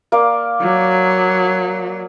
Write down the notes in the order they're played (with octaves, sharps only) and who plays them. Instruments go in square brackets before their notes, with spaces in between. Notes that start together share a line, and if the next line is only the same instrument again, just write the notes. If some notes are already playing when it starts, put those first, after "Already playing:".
[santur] A#3 D5 F5
[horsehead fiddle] F#3